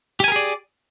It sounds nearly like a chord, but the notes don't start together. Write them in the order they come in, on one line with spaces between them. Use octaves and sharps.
G4 G#5 A#4 G#4 D5